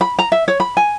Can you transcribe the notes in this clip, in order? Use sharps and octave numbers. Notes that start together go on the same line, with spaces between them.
B5
A#5
E5
C#5
B5
G#5